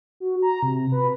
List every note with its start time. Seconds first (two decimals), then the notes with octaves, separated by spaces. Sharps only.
0.20 F#4
0.42 A#5
0.63 C3
0.92 B4